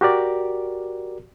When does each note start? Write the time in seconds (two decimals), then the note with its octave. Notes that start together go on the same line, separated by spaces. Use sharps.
0.01 F#4 G4 A#4 D5